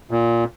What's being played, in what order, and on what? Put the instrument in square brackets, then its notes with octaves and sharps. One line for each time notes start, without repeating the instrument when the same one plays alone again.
[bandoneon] A#2